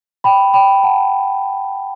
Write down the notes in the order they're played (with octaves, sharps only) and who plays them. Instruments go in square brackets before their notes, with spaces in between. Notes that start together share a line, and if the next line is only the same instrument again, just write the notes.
[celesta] G5 B5
G5 B5
F#5 A5